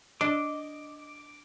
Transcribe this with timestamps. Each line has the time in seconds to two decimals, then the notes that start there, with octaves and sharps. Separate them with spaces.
0.21 D4 D#5 D6